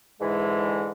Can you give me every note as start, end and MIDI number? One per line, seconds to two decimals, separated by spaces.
0.21 0.91 44
0.21 0.91 50
0.21 0.91 52
0.21 0.91 56